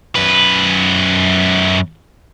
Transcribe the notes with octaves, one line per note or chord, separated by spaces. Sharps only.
F#2 B4